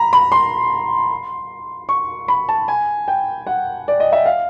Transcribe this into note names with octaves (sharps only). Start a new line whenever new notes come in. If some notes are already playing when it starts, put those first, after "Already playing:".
Already playing: A#5 B5
B5
C6
C#6
B5
A5
G#5
G5
F#5
D5
D#5
E5
F5